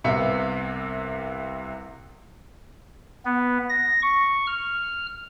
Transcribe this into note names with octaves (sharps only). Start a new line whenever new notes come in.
C2 C3 B3 E5 F5 C#7
B3
A#6
C#6
F6